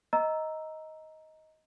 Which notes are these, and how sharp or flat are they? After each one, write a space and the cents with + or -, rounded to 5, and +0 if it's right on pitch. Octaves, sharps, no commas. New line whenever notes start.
D#5 +15 A#5 +0 E6 +0